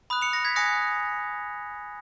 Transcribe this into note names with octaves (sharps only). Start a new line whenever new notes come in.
B5 D#6 F#6
C#7 F7
A#6
G#6 B6
G#5 D#6 F#6 A#6 C#7